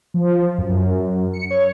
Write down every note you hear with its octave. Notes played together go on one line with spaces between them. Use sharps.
F3
F#2
C#7
C#5